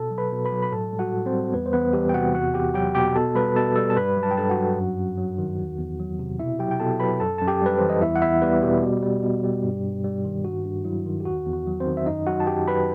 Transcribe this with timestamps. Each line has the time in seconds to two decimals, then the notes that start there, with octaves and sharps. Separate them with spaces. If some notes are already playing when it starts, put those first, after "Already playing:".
Already playing: B2 A4 A5
0.11 F#3
0.18 B4 B5
0.32 B2
0.45 B4 B5
0.52 F#3
0.62 B5
0.72 A2 A4 A5
0.93 G3
0.99 F#4 F#5
1.12 A2
1.26 C4 C5
1.32 G3
1.53 E2 B3 B4
1.66 C5
1.73 E2 B3 B4
1.93 E3 G3 G4
2.09 G5
2.14 C3 F#4 F#5
2.34 E2 F#4 F#5
2.54 E2 G4 G5
2.74 F#3 G4 G5
2.95 B2 G4 G5
3.16 B2 A4 A5
3.35 G3 B4 B5
3.55 B2 A4 A5
3.76 G3 A4 A5
3.90 A5
3.96 G2 B4 B5
4.17 F#3
4.23 A5
4.31 G5
4.37 G2 A4 A5
4.50 F#4 F#5
4.57 F#3
4.77 F#2
4.98 F#2
5.18 F#3
5.38 D#3
5.59 E2
5.78 E2
6.00 F#3
6.19 C3
6.39 B2 E4 E5
6.59 F#3 G4 G5
6.71 G5
6.80 B2 A4 A5
7.00 F#3 B4 B5
7.20 F#2 A4 A5
7.38 F#2 A5
7.48 G4 G5
7.62 G3 B4
7.78 E3 C5
7.90 D#5
8.01 E2 E4 E5
8.16 F#5
8.22 E2 E4 E5
8.42 G3 B3 B4
8.63 B2 G3 G4
8.83 B2
9.02 G3
9.23 B2
9.44 G3
9.63 G2
9.84 G2
10.04 G3
10.25 D#3
10.45 G2 F#4
10.65 G2
10.85 F#3 E4
11.06 D#3
11.20 G4
11.25 E2 F#4
11.46 E2
11.53 F#4
11.67 F#3
11.80 C4 C5
11.86 D#3
11.97 E5
12.06 F#2 D#4 D#5
12.27 F#3 F#4 F#5
12.40 A5
12.47 F#2 G4 G5
12.67 F#3 B4 B5